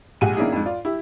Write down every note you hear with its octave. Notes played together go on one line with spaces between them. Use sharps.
A#1 G#3 G4 F#5 G#5 D#7
D#3 A#3 C#4 D4 E4 G#4
F2 G#2
F4 D5
E4 G4